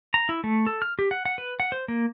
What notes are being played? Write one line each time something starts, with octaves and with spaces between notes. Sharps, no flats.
A#5
E4
A3
A4
F6
G4
F#5
F#5
B4
F#5
C5
A#3